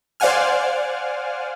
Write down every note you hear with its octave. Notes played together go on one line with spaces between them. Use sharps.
C5 D5 F5 F#5 G#5 F6